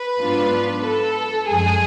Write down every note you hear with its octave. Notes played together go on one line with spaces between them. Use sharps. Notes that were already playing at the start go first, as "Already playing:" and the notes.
Already playing: B4
G#2 F#3 B3 D4 F4
A4
F#2 F3 G#3 G#4